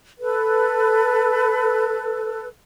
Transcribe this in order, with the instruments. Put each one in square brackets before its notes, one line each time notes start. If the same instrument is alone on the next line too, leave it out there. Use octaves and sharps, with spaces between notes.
[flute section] A4 B4